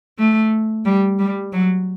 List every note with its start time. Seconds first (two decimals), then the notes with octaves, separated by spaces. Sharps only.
0.18 A3
0.85 G3
1.19 G3
1.53 F#3